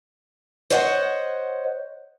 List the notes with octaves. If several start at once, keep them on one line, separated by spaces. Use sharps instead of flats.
C5 C#5 D#5 F#5